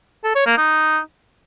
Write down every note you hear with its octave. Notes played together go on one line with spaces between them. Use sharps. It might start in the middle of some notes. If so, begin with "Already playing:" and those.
A4
C#5
A#3
D#4